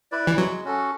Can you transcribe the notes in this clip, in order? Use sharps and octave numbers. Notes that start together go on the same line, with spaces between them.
E4 B4 D5
E3
F#3 G#3
C#4 F#4 A4